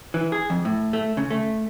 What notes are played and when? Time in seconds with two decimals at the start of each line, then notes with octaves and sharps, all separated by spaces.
0.14 E3
0.32 G#4
0.50 F2
0.65 A2
0.93 A3
1.17 C#3
1.31 A3